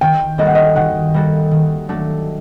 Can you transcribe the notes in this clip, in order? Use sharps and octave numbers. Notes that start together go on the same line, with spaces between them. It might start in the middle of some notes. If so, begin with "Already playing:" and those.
D#3 G5
G3 A#3 F#4 A4 D#5
F#5
D#5
D#3 F#5
G3 A#3 F#4 A4
D#3
F#3 A3 D4